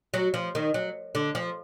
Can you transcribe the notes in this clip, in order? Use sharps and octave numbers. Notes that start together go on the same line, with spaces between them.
F#3
F3
D#3
F#3
D3
F3